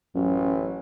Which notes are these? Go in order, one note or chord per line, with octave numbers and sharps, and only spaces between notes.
A1 F#2